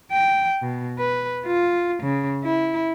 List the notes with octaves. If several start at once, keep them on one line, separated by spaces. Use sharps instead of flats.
G5
B2
B4
F4
C#3
E4